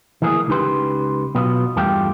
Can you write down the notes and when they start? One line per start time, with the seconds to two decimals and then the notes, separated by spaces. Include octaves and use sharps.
0.22 E3 A3 A#3 G#4
0.48 C#2 D#4 G4 B4 C6
1.35 B2 F#3 B3 F4
1.76 E2 G2 A3 F4 G4